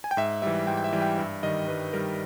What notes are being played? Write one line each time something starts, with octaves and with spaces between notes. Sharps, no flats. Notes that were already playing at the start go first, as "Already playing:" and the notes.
G#5
G5
G#2 E5
E3 G3 E5
G#2 G5
G5
E5
E3 G3
G5
G2 E5
D#3 G3 D#5
G2 B4
D#3 G3 A#4